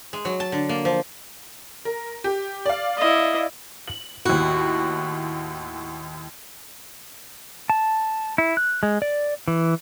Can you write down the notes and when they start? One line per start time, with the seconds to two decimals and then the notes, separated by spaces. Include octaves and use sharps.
0.13 G#3
0.25 F#3
0.40 A5
0.52 D3
0.69 A#3
0.85 F3
1.85 A#4
2.24 G4
2.66 D5 F5
2.98 E4 D#5
3.88 F#7
4.25 D#2 A2 F#4
7.70 A5
8.38 E4
8.57 F#6
8.83 G#3
9.02 D5
9.48 E3